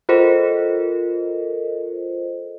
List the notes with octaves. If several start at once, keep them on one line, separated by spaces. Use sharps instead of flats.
F4 A4 A#4 C5 D#5